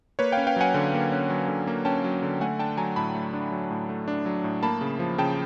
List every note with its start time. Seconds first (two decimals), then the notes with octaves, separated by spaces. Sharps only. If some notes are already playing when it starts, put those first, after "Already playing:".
0.19 A#3 B4 C#5
0.32 C#4 F5 G5
0.47 F5 G5
0.56 F#3 F#5 G#5
0.74 D3
0.94 A#3
1.12 C#4
1.30 F#3
1.48 D3
1.67 A#3
1.85 C#4 G5 A5
2.04 F#3
2.23 D3
2.41 A3 F#5 G#5
2.59 D4 G5 A5
2.77 F#3 G#5 A#5
2.96 A2 A5 B5
3.15 A3
3.33 D4
3.51 F#3
3.71 A2
3.89 A3
4.08 D4
4.26 F#3
4.44 A2
4.63 A#3 A5 B5
4.81 C#3
4.99 F3
5.18 C#3 G5 A5